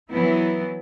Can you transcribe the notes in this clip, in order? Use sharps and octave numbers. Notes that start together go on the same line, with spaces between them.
E3 F#3 B3 E4